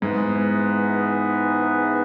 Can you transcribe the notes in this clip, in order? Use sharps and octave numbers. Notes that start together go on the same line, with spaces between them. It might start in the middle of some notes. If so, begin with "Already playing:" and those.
G#2 E3 B3 D#4 G#4 B4